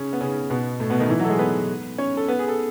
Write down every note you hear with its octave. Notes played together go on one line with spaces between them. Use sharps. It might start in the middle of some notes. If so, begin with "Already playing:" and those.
Already playing: C#3 C#4
B3
C#3 C#4
B2 B3
A2 A3
B2 B3
D#3 D#4
E3 E4
F#3 F#4
A4
G#3 G#4
B3 B4
C#4 C#5
A4
B3 B4
G#4
A4